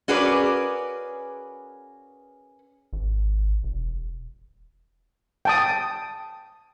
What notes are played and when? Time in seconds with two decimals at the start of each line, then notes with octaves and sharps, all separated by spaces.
0.08 C#4 F#4 G#4 A#4 B4 D5
2.93 G#1
3.63 E1
5.45 G5 A5 D#6